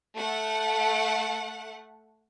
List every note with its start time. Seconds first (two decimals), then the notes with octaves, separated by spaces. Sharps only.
0.16 A3 F#5